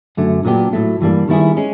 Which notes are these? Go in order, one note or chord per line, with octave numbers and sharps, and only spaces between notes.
F#2 D3 F#3 A3
A#2 F#3 B3 D4 G4
A2 F#3 A3
G2 E3 G3 A#3 D4
D#3 G3 B3 E4 G#4
G#3 C#4